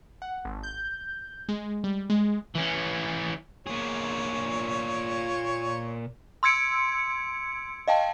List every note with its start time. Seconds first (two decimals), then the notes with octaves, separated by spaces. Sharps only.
0.22 F#5
0.45 G#1
0.63 G6
1.49 G#3
1.84 G3
2.10 G#3
2.55 E3 C#4
3.67 A#2 G#4 C#5
6.43 C6 E6 G#6 C#7 D7
7.88 D#5 F5 G5 A5